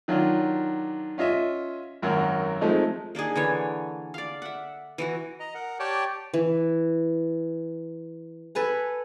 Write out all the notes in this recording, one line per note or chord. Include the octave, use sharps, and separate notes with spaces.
D#3 F#3 D4 F4
C#4 F4 D#5 E5
G#1 F#2 F#3 A#4
F3 G#3 A3 C4 D#4
A#3 D4 D#4 G#4
D3 E3 C#5
D5 F5
E5 F#5
E3 E4 F#4
D#5 A#5
A#4 F#5
G4 C#5 D5 G5 A5
E3
A4 B4 G#5 A#5